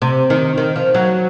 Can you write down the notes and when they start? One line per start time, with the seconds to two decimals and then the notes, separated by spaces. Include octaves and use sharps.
0.02 C3
0.30 D#3
0.58 D#3
0.76 F3
0.95 F#3